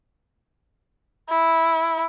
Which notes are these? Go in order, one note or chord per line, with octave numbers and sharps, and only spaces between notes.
E4